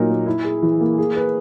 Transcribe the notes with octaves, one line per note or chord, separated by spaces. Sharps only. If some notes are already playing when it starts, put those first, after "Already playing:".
Already playing: A#2 F#3 D#4 A#4
A#3
E4
G#4
E3
A#3
G#4
B4